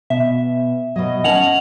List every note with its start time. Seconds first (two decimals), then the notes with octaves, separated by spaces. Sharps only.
0.10 B2 E5
0.96 B2 F#3 D#5
1.24 C#4 F#5 G#5 A5 F7 F#7